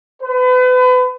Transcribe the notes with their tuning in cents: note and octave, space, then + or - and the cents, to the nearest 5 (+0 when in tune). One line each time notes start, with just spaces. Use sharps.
B4 +35